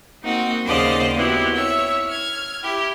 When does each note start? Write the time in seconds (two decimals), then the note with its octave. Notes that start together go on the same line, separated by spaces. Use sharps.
0.22 A#3 C4 D#4 F#4
0.65 D#2 C#3 C5 D5 D#5 F5
1.15 B3 C4 E4 F#4 G4
1.53 C#5 E5 E6
2.07 F6 G#6
2.63 E4 G4